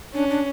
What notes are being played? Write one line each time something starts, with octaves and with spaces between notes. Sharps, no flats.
C#4 D4
D4